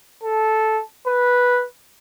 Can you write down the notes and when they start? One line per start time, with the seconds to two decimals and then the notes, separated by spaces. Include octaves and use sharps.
0.23 A4
1.07 B4